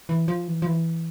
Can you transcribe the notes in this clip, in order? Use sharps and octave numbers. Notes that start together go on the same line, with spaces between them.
E3
F3
E3
F3
E3